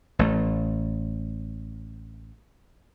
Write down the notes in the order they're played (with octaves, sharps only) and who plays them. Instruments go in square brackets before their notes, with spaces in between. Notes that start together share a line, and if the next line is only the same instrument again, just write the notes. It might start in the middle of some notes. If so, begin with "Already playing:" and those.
[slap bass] A1 A3